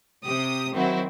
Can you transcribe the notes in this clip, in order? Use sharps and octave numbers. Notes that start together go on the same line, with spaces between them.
C3 G4 D#6
D#3 F#3 C4 E4 F#4